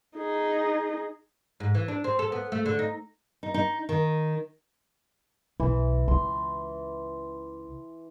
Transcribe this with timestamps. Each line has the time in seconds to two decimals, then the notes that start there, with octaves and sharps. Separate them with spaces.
0.18 D#4 G#4
1.60 G#2
1.75 E3
1.88 D4
2.04 C4
2.19 A4
2.32 B3
2.52 A3
2.66 D3
2.79 D#4
3.43 D#4
3.54 D#4
3.89 D#3
5.60 B1 E3
6.08 C#2 C6